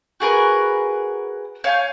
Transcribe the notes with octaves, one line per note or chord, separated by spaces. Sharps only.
F#4 G#4 A#4 B4
C#5 F5 G#5 G6